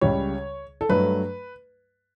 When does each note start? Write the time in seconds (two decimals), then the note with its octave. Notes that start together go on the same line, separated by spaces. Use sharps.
0.01 C#2 C#3 G3 C#5
0.81 A4
0.89 G2 F#3 A3 B4